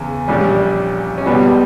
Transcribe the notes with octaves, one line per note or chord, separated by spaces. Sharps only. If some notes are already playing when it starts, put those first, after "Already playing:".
Already playing: E2 C#3
A#1 A#2 G3 C#4
C#4
C#2 B2 G3 B3